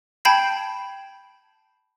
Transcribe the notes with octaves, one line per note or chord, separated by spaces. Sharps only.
G5 A5 B5 G6 G#6 C7